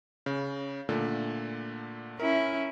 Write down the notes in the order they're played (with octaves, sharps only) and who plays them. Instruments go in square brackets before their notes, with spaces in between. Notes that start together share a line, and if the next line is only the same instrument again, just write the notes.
[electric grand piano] C#3
A#2 D3 A3
[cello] C#4 E4 [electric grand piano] A#4